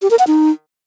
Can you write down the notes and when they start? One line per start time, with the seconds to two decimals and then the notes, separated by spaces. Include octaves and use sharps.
0.02 G4
0.10 A#4
0.19 F#5
0.27 D#4